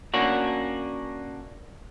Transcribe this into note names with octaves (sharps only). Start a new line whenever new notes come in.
A#3 C#4 D4 F#4